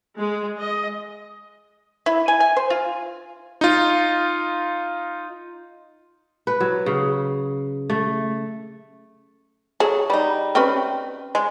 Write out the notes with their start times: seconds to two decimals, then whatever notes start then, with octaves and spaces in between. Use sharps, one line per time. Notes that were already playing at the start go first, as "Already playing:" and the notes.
0.18 G#3
0.60 D#5
2.06 E4
2.28 G#5
2.40 G#5
2.56 C5
2.70 F4
3.61 D#4 F4
6.47 B4
6.60 F#3
6.86 C#3
7.90 A3
9.80 F#3 G#4 A4
10.10 G3 D#4
10.55 C4 C#4 B4
11.35 G#3